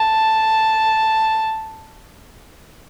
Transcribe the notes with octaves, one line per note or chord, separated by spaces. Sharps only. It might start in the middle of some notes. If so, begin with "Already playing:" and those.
Already playing: A5